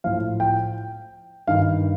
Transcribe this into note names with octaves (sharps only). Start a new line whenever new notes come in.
A2 F3 F5
G5
G2 D#3 F5